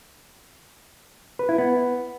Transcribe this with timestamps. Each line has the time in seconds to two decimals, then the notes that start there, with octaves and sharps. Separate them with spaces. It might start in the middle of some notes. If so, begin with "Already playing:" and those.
1.39 B4
1.49 E4
1.58 B3